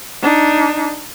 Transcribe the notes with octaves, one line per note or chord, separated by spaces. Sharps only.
D4 D#4